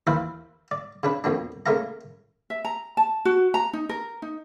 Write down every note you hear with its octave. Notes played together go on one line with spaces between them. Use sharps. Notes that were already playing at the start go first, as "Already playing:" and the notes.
D#2 E3 B4 C5 E5 F5
D5
C#3 D4 B4
F2 B2 A#3 D4
C#3 A3 A#3 A#4 F5 A#5
E5
A#5
A5
F#4
A#5
D#4
A#4
D#4